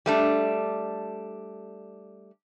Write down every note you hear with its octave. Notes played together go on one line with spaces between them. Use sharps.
G3 A3 D4